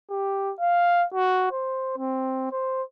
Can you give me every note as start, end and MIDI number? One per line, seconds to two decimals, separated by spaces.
0.10 0.52 67
0.60 1.05 77
1.14 1.49 66
1.52 1.97 72
1.97 2.50 60
2.52 2.82 72